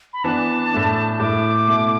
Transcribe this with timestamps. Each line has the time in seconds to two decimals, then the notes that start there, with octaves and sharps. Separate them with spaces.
0.13 B5
0.24 E3 B3 D4 A5
0.72 A2 A3 D4
1.20 A2 A3 E4 D6
1.67 B2 A3 E4